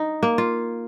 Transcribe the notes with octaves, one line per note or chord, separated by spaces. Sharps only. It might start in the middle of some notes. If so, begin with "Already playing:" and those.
Already playing: D#4
A#3
F4